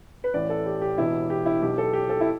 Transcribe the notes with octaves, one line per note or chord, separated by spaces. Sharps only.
B4
A1 A2 E3 D5
A4
G4
G4
E1 E2 B2 E4
G4
E4
B1 B2 G4
A4
G4
A4
E4